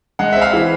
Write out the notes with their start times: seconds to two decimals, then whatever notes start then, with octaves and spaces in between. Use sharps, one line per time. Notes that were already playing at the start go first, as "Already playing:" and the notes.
0.19 G#3 F#5
0.33 C4 E5
0.42 F5
0.53 E3